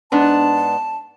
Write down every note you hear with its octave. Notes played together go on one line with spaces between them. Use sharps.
G#2 B3 D4 A5